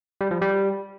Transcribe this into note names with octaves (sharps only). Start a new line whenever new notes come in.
G3
F3
G3